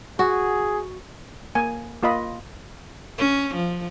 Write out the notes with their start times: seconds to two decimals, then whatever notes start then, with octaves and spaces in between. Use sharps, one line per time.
0.19 F#4 G#4
1.55 A#3 G#5
2.03 A#3 F4 D#5 B5
3.18 C#4
3.54 F3